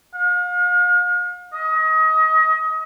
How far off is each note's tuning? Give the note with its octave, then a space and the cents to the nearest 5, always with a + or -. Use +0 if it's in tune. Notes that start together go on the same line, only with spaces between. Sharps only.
F5 +40
D#5 +30